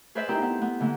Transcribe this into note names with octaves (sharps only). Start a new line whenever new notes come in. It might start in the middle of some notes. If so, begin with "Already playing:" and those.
G#4 B4 C5 D5 E5 F5
C4 D#4 E4 G4 A#4
B3 C4 E4 A4
B3
D3 E3 A#3